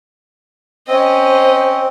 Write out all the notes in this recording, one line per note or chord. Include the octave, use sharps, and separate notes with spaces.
C4 C#4 C5 D#5